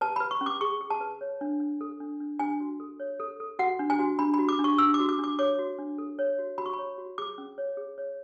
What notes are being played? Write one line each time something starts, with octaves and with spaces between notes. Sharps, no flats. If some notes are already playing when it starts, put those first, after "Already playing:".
B4 A5
B4 B5
C#6
C#4
D6
G#4 C#6
G#4
A5
B4
C#5
D4
D4
A4
D4
D4
D4 G#5
F#4
A4
C#5
A4
A4
F#4 F#5
D4
G#5
F#4
D4 B5
F#4 B5
D6
D4
C#6
D4 E6
D6
F#4
D6
D4 D6
C#5 D6
F#4
D4
A4
C#5
F#4
F#4 B5
C#6
C#5 B5
F#4
G#4 D6
C#4
C#5
G#4
C#5